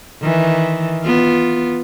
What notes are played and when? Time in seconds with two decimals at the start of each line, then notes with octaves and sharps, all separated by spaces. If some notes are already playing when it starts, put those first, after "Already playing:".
0.21 D#3 E3
1.02 B3 F4